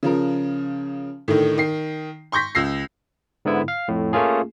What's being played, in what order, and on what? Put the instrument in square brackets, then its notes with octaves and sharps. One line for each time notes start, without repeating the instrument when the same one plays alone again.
[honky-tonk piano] C#3 F3 A#4
A2 D3 D#3
D#3 C7
C6 C#6 G6 A#6 B6
C#2 E6 A#6 C7
[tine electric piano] G#2 D3 B3 E4
F5
F2 A2
A3 A#3 C#4 F4 G#4